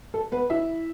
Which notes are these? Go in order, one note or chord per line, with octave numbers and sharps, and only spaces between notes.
A4
B3 B4
E4 E5